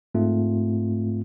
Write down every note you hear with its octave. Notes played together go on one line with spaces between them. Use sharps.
G#2 A3 C4 F4